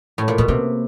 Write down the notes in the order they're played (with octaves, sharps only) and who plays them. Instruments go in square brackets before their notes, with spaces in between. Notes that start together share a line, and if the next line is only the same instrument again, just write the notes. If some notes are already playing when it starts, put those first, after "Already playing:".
[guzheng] A2
A#2
[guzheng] B2 [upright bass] A3
[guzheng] C3 [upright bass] A#3